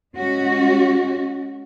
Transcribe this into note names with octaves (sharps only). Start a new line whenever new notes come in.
G#3 C#4 F#4